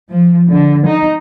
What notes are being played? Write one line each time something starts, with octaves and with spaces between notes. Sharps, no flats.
F3
D3
D#4